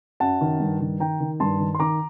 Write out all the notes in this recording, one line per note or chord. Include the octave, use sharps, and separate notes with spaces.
F#2 F#5 A5
D#3
G2
D#3
D#3 G5 A#5
D#3
G2 A5 C6
D#3
C6
D#3 A#5 D6